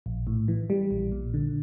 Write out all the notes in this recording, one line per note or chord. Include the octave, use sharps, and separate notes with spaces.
A#1
A2
E3
G3
A#1
A#2
D3